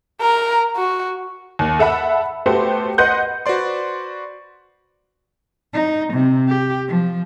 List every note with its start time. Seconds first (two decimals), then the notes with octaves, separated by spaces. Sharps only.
0.21 A#4
0.76 F#4
1.59 D#2
1.79 A4 E5 F#5 B5
2.46 A3 B3 F#4 G4 C5
2.98 B4 D#5 F#5 C6 G6
3.46 F#4 B4 C5 D5 C6
5.72 D#4
6.13 C3
6.48 G4
6.87 F3